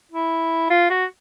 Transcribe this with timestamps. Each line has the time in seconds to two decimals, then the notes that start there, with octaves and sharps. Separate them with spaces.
0.11 E4
0.70 F4
0.90 F#4